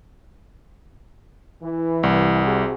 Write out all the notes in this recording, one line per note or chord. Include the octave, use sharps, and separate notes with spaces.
E3
C2
C3 F#4 G#4